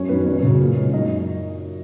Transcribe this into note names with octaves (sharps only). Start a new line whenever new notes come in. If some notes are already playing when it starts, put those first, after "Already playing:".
Already playing: F#2 C#4 C#5
D#3 F#3 B3 B4
F#2 C#4 C#5
C#3 F#3
A#2
G#3
F#2 D#4 D#5